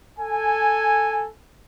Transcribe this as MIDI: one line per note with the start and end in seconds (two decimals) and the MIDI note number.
0.18 1.28 69
0.18 1.28 80